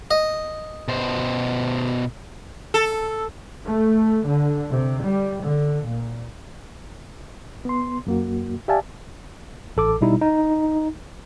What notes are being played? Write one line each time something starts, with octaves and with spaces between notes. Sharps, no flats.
D#5
B2 C5
A4
A3
D3
C3
G3
D3
A#2
B3 C6
F#2 A#3 F#4
G4 D5 E5 F5 G#5 A5
A1 A4 D6
B2 G3 D#4 E4
D#4